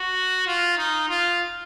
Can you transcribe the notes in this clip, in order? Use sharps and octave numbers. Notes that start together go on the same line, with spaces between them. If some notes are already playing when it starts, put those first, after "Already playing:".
Already playing: F#4
F4
D#4
F4